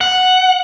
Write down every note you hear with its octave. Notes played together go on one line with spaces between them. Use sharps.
F#5